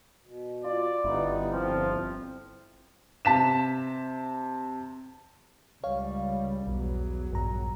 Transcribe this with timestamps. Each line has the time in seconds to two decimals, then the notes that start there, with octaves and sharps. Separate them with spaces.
0.24 B2
0.64 F4 D5
1.04 G1 G3 B3 D#4 E4
1.53 F2 F3 C4
3.25 C3 A5 B6 E7
5.84 C#2 G3 C#5 F5
6.67 B1 E2 F#3
7.32 A#1 G2 A#5